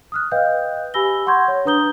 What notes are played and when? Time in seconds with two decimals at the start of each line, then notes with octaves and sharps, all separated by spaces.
0.12 D#6 F6 F#6
0.31 B4 D#5 F5 G5 G6
0.94 G4 G#5 B5 E6 A#6 G7
1.27 F#5 C6 C#6 G6 G#6
1.48 C#5
1.65 D4 B4 A#5 D#6 G6 G7